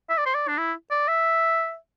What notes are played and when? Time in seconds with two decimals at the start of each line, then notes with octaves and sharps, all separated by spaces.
0.10 E5
0.18 D5
0.26 C5
0.35 D5
0.48 D4
0.58 E4
0.91 D5
1.08 E5